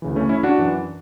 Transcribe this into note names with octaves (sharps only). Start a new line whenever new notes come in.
D2 C#3 E3
A3 C#4
C#4 E4
D4 F#4
F#2 E3